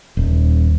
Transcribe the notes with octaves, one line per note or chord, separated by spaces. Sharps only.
D#1